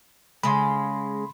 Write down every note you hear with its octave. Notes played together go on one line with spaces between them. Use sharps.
C#3 G#3 B5 C6